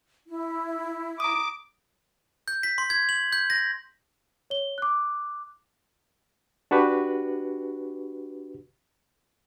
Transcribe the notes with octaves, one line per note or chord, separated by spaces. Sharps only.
E4
A#5 D6 D#6
G6
B6
C6
G#6
F#7
G6
A#6
C#5 G7
D6 F#6
D4 F#4 G4 B4